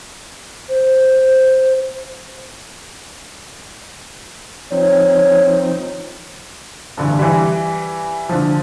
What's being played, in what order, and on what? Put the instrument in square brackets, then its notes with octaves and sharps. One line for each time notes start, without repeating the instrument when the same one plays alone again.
[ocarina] C5
[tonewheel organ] F3 C4 D#4 [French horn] C#5
[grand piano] G2 D3 E3
E3 G3
D3 F3